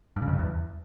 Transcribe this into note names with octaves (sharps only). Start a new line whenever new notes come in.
G2
C#3
F2
G2
E2